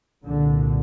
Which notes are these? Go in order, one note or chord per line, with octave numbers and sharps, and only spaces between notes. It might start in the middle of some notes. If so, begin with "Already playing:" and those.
C2 A#2 D3